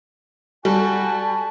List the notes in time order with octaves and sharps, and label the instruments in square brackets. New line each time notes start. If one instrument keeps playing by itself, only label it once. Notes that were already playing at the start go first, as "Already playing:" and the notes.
[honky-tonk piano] G3 [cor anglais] F#4 [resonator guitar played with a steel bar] A4 [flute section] G#5 A5